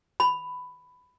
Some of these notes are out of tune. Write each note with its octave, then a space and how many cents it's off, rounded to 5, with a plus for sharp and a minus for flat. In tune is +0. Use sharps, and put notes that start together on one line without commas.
B5 +10